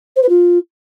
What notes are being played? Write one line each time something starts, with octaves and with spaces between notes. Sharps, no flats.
C5
B4
F4